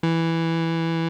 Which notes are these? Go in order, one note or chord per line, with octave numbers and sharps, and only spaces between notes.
E3